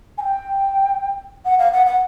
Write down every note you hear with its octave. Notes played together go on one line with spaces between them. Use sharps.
G#5
G5
F#5
F5
F#5
F#5